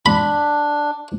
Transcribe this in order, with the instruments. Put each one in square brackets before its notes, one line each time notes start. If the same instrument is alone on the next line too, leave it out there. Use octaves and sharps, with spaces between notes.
[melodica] D4 [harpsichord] B5